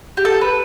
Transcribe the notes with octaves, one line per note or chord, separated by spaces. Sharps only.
G4
A4
B4